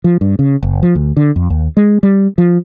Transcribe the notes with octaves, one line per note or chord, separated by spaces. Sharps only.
F3
G2
C#3
F#1
F3
D2
D3
F2
D#2
G#3
G3
F3